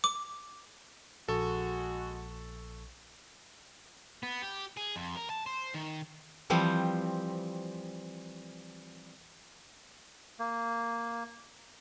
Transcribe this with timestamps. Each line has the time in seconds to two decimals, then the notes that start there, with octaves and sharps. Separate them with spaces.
0.04 D6
1.28 A#1 G#3 F#4 A4 C#6
4.23 B3
4.42 G4
4.77 G#4
4.96 F2
5.15 A#4
5.30 A5
5.46 C5
5.74 D#3
6.50 E3 F3 G3 C4
10.39 A#3